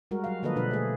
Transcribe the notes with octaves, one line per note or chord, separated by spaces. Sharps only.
G3 G#3 F#4 A#4
F#3 F5
D3 F3 A#3 A4 B4 D#5
B2 D4 B4
A3 G#4